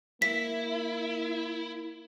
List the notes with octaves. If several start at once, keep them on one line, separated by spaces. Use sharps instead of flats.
A#3 E4 B6